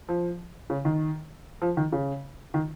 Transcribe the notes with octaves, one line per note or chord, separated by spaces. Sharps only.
F3
C#3
D#3
F3
D#3
C#3
D#3